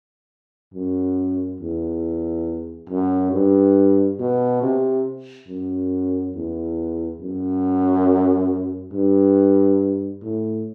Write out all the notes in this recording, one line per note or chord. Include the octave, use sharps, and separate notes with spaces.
F#2
E2
F#2
G2
B2
C3
F#2
E2
F#2
G2
A2